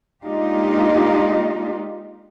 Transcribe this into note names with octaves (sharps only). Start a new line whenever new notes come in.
G#3 A#3 D4 D#4 F4 G4